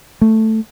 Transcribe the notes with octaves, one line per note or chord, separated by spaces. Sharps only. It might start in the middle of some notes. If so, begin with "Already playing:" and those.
A3